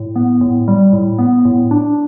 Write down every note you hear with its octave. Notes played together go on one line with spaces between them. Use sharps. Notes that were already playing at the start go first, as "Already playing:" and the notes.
Already playing: A2
B3
A2
G3
A2
B3
A2
D4